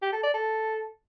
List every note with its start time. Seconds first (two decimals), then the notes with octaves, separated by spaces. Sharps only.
0.02 G4
0.13 A4
0.23 D5
0.34 A4